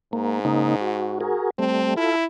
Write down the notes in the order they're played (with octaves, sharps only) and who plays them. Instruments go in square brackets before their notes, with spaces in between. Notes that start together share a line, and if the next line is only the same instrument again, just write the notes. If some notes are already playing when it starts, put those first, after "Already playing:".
[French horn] G#2 [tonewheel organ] A#3
[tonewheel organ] C#3 A#3 D#4
F#4
F#4 G#4 A#4
[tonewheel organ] G3 A3 [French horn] C4
[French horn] E4 [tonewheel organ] F4 A4